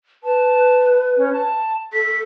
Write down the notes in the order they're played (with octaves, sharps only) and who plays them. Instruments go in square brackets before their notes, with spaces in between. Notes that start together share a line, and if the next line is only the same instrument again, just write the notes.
[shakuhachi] B4 [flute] A5
[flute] C#4
A5
[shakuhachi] A4 [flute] B6